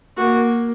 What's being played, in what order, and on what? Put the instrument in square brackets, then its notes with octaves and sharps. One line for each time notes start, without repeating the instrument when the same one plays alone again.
[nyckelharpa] A#3 [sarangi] F#4